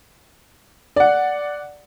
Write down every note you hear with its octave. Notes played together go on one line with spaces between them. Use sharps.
D5 F#5